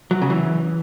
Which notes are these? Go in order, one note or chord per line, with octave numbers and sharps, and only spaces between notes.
F#3
C#3
E3